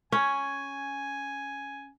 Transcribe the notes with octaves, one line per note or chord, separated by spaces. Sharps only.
C#4 G#5